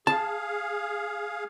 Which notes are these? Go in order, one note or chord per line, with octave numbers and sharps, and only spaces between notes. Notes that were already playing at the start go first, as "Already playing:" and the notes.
G#4 F5 A5